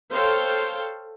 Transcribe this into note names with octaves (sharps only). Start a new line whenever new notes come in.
A4 C5 C#5 F5 G5